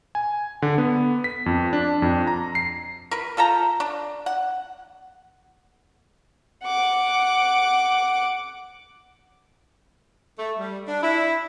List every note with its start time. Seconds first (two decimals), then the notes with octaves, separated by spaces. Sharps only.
0.15 G#5
0.62 D3
0.78 B3
1.24 B6
1.46 F2
1.73 D4
2.02 F2
2.27 A#5
2.55 C7
3.11 A#4 B4
3.37 F4 A4 G5 A#5
3.80 D4
4.26 F#5
6.63 F#5 D6
10.39 A3
10.59 G3
10.88 D4
11.03 E4